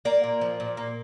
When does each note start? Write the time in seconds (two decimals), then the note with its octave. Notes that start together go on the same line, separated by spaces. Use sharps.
0.05 A#3 A#4 D5
0.23 A#2
0.41 F3
0.60 A#2
0.77 A#3